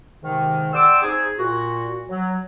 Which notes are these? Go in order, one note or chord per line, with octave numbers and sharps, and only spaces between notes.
G#2 C3 D#3
D5 F#5 G5 C6 D6 E6
C4 D#4 G#4
A#2 F#4
F#3